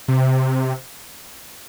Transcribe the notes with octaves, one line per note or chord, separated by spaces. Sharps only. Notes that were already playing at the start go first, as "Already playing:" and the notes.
C3